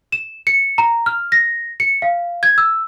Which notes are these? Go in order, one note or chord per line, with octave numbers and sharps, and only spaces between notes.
E7
C#7
A#5
F6
A#6
C#7
F5
G#6
E6